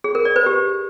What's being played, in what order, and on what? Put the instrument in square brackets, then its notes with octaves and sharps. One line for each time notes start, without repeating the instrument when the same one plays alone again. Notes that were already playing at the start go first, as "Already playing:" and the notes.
[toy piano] G#4
A#4
D5
B4
G4